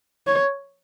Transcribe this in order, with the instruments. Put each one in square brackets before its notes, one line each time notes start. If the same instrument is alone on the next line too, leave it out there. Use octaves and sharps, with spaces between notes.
[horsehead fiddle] C#5